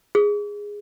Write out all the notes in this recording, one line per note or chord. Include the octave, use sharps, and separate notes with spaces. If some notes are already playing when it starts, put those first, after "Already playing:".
G#4